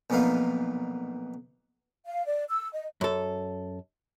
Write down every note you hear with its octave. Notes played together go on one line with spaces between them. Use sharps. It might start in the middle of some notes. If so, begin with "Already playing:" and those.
B1 F2 A#2 B3 D#4 F5
F5
D5
E6
D#5
F#2 A4